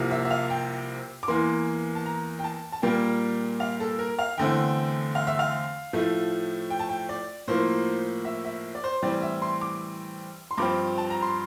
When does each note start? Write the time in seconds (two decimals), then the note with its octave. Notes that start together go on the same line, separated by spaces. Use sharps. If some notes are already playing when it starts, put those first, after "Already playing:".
Already playing: C2 C3 F3 A#3
0.11 E5
0.25 E5
0.31 F5
0.50 G5
1.23 D6
1.28 E2 E3 A#3 C6
1.95 A5
2.05 A#5
2.39 G5
2.44 A5
2.72 A5
2.82 A#2 G3 A#3 G5
3.60 F5
3.80 A4
3.99 A#4
4.19 F5
4.38 E2 D3 A3 C4 G5
5.15 F5
5.27 E5
5.39 F5
5.93 A2 F3 A3
6.70 G5
6.79 A5
6.89 G5
7.09 D5
7.48 A2 F3 A#3 C5
8.25 E5
8.45 E5
8.75 D5
8.84 C5
9.02 A2 E3 G3 C4 D5
9.22 E5
9.42 C6
9.61 D6
10.51 C6
10.58 G2 F3 C4 D6
10.98 A5
11.10 A#5
11.22 C6